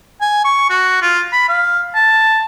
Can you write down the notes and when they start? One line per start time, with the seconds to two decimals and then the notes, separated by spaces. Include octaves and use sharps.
0.21 G#5
0.45 C#6
0.70 F#4
1.02 F4
1.33 B5
1.49 F5
1.95 A5